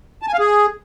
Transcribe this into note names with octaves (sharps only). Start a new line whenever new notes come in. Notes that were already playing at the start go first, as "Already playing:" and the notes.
A5
G#5
F5
G#4